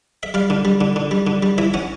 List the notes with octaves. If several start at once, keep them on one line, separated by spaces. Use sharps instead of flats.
E5
G3 F5
D3
G3
D3
D3
G3
D3
G3
E3 E5
C#4 F#5